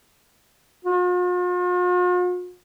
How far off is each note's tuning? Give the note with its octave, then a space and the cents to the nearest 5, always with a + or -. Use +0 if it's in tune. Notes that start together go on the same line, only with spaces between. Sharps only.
F4 +45